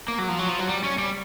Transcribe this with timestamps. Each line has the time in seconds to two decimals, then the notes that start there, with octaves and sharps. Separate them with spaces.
0.08 A#3
0.18 F#3
0.29 F3
0.39 F#3
0.49 F3
0.59 F#3
0.68 G3
0.84 C#4
0.98 G3